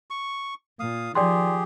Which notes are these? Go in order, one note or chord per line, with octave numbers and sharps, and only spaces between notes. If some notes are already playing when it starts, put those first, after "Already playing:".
C#6
A#2 F5 D#6
D#3 F3 G4 G#4 D5 G5 C6